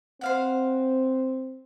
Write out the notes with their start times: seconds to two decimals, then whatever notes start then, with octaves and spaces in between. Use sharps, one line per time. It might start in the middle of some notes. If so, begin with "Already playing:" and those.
0.21 C4 C5 F5 F#5